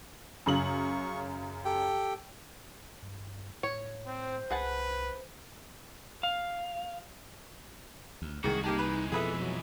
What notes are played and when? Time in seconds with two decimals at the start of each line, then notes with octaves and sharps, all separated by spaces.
0.46 F#2 C#3 C#6 F#7
1.65 G4 A4 G5
3.02 G2
3.63 A2 C#5
4.07 C4 C5
4.50 C2 G#4 B4 F#5 A5
6.23 F5
8.22 D2
8.44 C2 G#2 D#3 F#4 G#4
8.64 G#3 A#3 D#4 G4 A5
8.79 E3 G#3 B4
9.12 F2 B2 F3 G#4 A4 B4 E5
9.39 F#3